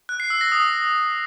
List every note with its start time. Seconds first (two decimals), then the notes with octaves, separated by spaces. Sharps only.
0.09 F#6
0.20 C7
0.30 E6
0.41 A#6
0.52 D#6